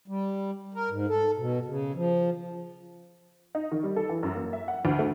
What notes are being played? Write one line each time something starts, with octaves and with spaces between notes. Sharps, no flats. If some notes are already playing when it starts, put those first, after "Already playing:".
G3
A#4
G#2
A4
B2
C#3
F3
D#4
D#3
G3
A4
E3
F#2
A#3
E5
F#5
D2
A3